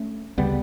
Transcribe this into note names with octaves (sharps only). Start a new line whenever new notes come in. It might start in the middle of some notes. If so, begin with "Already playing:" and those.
Already playing: A3 C#4
D2 C#3 G3 B3